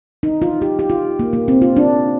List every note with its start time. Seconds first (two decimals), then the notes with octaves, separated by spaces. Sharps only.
0.23 D#4
0.42 F4
0.62 G4
0.79 G4
0.90 F4
1.19 A#3
1.33 A#3
1.48 C4
1.62 F4
1.77 D4